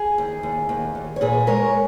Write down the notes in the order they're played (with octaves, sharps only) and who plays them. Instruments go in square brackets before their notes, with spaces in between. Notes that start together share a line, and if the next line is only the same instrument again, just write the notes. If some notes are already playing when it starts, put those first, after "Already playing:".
Already playing: [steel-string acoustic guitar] G#4
D#2
D#2
D#2
D#2
C#5
A#2 G#4 B4
G#3 A#4 C#5